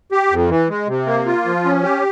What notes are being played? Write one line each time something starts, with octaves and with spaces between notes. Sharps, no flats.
G4
F2
E3
G#3
C3
A#3
F4
F3
C#4
G4